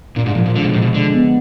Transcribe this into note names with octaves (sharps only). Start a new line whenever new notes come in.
A#2 D4
G#2
A#2 F3
A#2
D3 G#3
B2
A#2 F3
B2
D3 G#3
B3